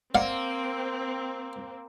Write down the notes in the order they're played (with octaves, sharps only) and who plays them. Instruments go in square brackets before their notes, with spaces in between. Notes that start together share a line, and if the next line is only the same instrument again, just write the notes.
[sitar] A#3 [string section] C4 [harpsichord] D5 F5 F#5